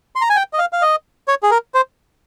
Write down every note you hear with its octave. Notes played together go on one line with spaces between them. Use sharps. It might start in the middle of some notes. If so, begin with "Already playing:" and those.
C6
A#5
G#5
G5
D#5
F5
F5
D#5
C#5
G#4
A#4
C5